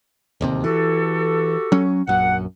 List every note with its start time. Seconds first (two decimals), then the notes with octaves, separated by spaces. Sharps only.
0.41 D1 D#2 C3
0.64 E3 F#4 G4 A4
1.72 F#3 C#4
2.07 A#1 F#2 F#5